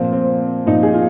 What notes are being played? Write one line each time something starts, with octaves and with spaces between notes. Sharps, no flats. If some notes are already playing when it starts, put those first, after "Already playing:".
Already playing: A#2 F3 C4
C4
A#2 F3 D#4
G#4
F4